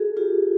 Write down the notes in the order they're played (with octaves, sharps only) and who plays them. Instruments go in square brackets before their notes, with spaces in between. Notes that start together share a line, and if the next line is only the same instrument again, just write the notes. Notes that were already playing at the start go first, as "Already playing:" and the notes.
Already playing: [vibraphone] F#4 G#4 A4
F4 G4